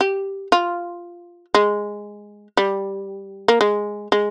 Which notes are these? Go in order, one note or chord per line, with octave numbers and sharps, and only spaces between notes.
G4
F4
G#3
G3
A#3
G#3
G#3